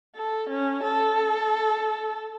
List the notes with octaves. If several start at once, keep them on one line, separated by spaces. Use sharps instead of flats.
A4
C#4
A4